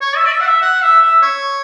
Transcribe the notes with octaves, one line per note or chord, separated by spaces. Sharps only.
C#5
E5
D5
E5
F#5
E5
F#5
E5
E5
C#5